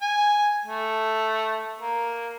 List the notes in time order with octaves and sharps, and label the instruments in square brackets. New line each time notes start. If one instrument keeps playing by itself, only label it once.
[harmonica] G#5
A3
A#3